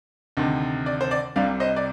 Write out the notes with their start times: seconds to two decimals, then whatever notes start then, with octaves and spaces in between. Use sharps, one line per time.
0.37 D2 C3 D#3
0.86 D5
1.01 C5
1.11 D5
1.36 C2 C3 G3 D5 F5
1.60 C5 D#5
1.76 D5